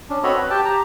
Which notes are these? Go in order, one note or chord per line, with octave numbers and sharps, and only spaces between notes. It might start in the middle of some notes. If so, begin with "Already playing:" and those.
C#4 D4
C4 F#4 A4 C#5 D#5 B5
B4
G4 G5 A5
G4 A#5